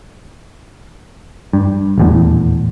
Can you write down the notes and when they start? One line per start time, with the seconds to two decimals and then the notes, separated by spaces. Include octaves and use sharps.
1.53 G2
1.98 D#1 E2 A2